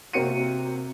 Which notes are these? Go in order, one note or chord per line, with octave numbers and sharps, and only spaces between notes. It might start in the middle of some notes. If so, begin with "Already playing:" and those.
C3 A#3 C4 F#4 C#7 D#7